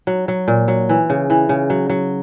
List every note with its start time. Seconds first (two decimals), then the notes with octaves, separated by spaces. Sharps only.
0.07 F#3
0.28 F#3
0.48 A#2
0.68 F#3
0.89 E3
1.10 C#3
1.30 E3
1.49 C#3
1.70 F#3
1.90 F#3